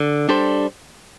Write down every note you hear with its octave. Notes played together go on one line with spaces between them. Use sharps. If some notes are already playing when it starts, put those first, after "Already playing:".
Already playing: D3
G3 D4 A4 C5